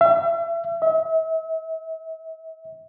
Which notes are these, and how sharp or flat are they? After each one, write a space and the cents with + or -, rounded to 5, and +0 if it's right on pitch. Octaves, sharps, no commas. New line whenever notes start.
E5 +40
E5 -40